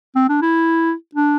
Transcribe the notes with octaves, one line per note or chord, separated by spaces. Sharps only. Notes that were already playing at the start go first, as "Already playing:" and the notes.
C4
D4
E4
D4